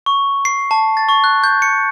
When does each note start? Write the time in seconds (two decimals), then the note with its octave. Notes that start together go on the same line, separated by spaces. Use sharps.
0.06 C#6
0.45 C7
0.71 A5
0.97 A6
1.09 C#6
1.24 F#6
1.44 G6
1.62 C#7